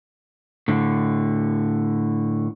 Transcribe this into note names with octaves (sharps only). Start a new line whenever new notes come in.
A2 D3